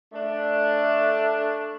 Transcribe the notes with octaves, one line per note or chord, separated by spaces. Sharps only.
A3 D4